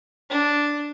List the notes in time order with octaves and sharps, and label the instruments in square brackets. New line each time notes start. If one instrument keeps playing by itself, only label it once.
[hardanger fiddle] D4